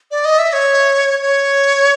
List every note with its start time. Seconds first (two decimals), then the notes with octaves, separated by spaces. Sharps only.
0.11 D5
0.25 D#5
0.39 E5
0.53 C#5
1.22 C#5